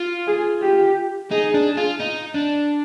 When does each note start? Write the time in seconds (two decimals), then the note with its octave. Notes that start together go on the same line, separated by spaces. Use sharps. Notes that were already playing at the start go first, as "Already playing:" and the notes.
Already playing: F4
0.27 G#4
0.62 G4
1.31 D#4 G#4
1.54 D4
1.78 F4
2.00 D#4
2.35 D4